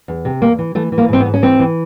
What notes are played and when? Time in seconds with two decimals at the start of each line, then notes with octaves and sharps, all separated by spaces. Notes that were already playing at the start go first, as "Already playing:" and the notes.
0.08 E2
0.25 C3
0.42 E2 A#3
0.59 E3
0.75 E3 A3
0.92 E3
0.98 A#3
1.08 G#2 C4
1.20 B3
1.26 G#2
1.34 C#4
1.42 E3 C4
1.59 E3